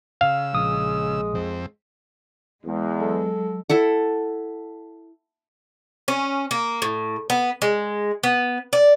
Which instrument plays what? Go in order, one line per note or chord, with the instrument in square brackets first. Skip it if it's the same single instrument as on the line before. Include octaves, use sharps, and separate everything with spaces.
[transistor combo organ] C#3 E6 [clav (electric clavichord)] F5
[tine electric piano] A#1 D#6 [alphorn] G#3
[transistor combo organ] F2 C4
[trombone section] E2 [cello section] G#3
[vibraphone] F#3 [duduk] A4
[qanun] E4 A4 F#5
[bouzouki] C#4
A#3
A2
B3
G#3
B3
D5